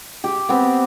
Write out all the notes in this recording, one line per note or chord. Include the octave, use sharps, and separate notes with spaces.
G4
B3 C4